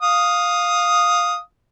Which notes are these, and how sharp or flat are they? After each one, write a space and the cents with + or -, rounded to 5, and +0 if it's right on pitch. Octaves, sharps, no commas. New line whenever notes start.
F5 +10 D#6 +0